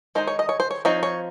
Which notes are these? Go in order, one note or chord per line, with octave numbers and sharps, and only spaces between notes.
D#3 G#3 D#4 C5
C#5
D#5
C#5
C5
C#5
F3 C4 D#4 C#5
C#5